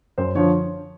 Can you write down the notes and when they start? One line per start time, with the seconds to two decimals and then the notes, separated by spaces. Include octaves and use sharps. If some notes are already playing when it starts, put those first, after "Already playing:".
0.18 F#2 C5
0.35 D3 F3 C#5